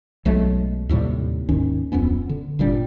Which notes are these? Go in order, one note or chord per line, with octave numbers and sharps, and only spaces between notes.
B1 F#3 G#3 A3
D#2 A2 C3 G3
D#2 G#2 D#3 C#4
D1 F2 B3 C#4
D3
G1 A#2 G3 D4